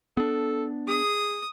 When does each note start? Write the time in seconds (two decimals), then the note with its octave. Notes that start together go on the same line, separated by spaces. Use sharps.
0.17 B3 D4 A4
0.88 G#4 D#6